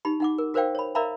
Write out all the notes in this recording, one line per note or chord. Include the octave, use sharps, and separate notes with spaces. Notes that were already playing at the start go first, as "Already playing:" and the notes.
D#4 G4 B5
D#4 F#5 D6
A#4
F#4 A#4 C5 D5 F5 G5
C#5 B5
A#4 D5 E5 F5 A#5 B5